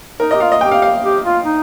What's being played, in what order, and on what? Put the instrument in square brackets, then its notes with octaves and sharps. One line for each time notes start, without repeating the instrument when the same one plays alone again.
[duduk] D#4 [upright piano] A#4
[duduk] G4 [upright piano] D#5
[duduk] F4 [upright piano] F5
[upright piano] D#5
[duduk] G4 [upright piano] G5
[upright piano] F5
F5
[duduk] G4
F4
D#4